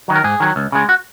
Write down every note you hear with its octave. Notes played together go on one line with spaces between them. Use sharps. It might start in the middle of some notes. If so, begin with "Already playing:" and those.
D#3 F#3
A#4
G#2 G#4
D#3 F#3
C#2
C#3 G#3
F#4